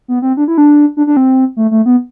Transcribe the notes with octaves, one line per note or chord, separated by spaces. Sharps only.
B3
C4
D4
E4
D4
D4
D4
C4
A3
A3
B3